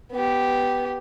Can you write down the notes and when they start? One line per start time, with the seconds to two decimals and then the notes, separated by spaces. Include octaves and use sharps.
0.12 B3 G4